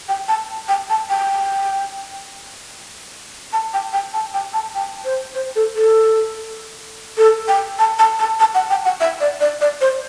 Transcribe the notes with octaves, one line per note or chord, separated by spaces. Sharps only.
G5
A5
G5
A5
G5
A5
G5
G5
A5
G5
A5
G5
C5
C5
A4
A4
A4
G5
A5
A5
A5
A5
F#5
G5
F#5
E5
D5
D5
D5
C5